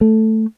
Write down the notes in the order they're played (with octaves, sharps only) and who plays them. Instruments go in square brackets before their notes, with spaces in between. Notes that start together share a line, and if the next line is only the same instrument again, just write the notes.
[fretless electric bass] A3